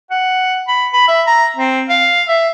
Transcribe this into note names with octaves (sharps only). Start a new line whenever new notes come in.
F#5
B5
B5
E5
A#5
C4
F5
E5